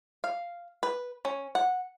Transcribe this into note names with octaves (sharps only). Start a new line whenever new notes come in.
F5
B4
C#4
F#5